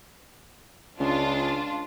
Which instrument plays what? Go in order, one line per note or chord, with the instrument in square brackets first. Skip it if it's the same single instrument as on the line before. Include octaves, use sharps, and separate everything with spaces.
[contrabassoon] C#2 [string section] D4 F4